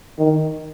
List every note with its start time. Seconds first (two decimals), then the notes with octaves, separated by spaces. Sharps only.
0.19 D#3